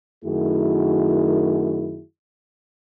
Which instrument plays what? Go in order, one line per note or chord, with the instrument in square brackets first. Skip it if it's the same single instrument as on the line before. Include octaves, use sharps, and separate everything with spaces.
[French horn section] F#2 D#3 A3 E4 F#4 G#4